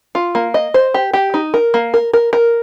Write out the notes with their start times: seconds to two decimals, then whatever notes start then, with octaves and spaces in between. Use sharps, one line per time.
0.15 F4
0.35 A#3
0.54 D#5
0.74 C5
0.94 G4
1.13 G4
1.34 D#4
1.54 A#4
1.74 A#3
1.94 A#4
2.13 A#4
2.33 A#4